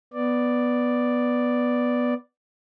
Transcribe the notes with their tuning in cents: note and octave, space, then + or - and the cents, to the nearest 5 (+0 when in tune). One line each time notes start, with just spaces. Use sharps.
B3 +0 D5 +0